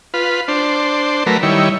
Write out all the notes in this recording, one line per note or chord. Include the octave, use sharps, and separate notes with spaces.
F4 B4
D4 C5
F#3 A3 A#4 B4
D#3 G3 E4 C#5